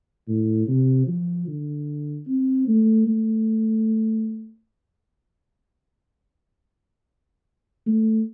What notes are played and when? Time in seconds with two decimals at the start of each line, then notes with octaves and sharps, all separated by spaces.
0.28 A2
0.68 C3
1.07 F3
1.47 D3
2.27 C4
2.67 A3
3.07 A3
7.87 A3